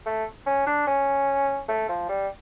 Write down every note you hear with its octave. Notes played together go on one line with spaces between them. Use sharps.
A3
C#4
D4
C#4
A3
F3
G3